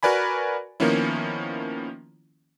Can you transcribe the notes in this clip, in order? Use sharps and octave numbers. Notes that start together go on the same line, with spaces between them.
F#4 A#4 B4 D5 G#5 B5
D#3 F3 A#3 B3 C#4 E4